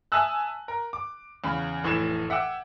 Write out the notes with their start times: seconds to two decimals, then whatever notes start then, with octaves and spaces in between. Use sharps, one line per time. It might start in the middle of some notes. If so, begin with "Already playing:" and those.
0.12 E5 G#5 A5 D#6 E6 F#6
0.68 A#4
0.93 D6
1.44 E2 C#3 B5
1.83 F1 A2 E3 B5 G#6 E7
2.30 E5 F#5 G5 D6 E6